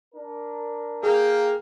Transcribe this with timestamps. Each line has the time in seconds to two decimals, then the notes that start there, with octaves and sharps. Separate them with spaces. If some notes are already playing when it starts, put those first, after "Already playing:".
0.14 D4 A#4
1.03 A#3 G#4 F5 G5